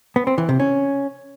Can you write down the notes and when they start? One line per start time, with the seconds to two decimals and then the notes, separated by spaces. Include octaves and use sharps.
0.16 B3
0.27 C4
0.38 E3
0.49 C3
0.60 C#4